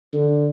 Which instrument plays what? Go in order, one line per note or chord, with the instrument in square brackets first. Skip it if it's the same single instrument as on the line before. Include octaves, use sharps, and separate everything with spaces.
[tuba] D3